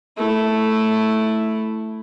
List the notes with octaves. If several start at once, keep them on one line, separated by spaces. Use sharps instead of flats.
A3 E4